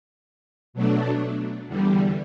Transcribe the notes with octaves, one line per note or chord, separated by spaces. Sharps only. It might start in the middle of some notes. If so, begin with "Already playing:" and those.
B2 F#3 A3 D4
E2 D3 G3